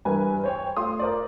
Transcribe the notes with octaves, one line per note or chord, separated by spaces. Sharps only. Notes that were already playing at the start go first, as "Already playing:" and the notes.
G2 E3 A#4 B4 G#5
C5 C#5 G5
A3 F4 C6 D#6
A#4 C5 D5